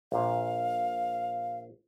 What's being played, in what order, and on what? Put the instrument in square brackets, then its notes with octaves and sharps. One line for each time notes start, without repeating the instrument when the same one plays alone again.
[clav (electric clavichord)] A#1 A#2 [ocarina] F5